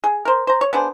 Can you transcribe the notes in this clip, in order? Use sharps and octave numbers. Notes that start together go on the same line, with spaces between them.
G#4
A#4 C5
C5 A#5
C#5
B3 D4 G#4 C5